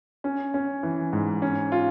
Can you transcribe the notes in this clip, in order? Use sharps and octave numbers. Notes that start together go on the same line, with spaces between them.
C#4
C#4
E3
G#2
C#4
F4